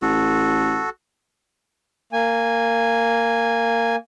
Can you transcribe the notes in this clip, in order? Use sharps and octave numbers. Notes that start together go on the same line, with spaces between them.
A1 F#4 A4
A#3 G#5